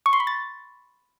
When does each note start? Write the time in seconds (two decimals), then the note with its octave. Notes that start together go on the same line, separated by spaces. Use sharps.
0.06 C#6
0.13 C6
0.20 B5
0.27 A6